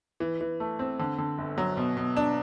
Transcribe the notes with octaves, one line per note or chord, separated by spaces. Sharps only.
E3
E3
A3
C4
D3
D3
G1
F#3
B2
B2
D4